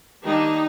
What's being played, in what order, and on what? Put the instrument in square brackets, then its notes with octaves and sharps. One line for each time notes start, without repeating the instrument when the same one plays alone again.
[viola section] D#3 G3 A#3 D4 D#4